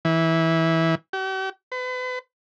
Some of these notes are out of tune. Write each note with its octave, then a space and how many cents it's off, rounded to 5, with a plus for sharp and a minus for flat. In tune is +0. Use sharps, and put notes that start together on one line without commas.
E3 -15
G4 -45
B4 +40